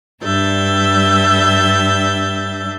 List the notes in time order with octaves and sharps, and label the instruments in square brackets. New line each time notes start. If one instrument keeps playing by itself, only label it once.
[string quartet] G2 G3 D4 E5 G6 A6